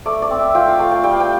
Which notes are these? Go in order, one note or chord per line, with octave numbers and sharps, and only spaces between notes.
A3 D5
D5
C4
E5
F4 G5
F5
A3 F5
G5
G3 G5
F5
G5